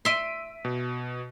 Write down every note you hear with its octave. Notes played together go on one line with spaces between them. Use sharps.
E5 C6 B6 D7 D#7
B2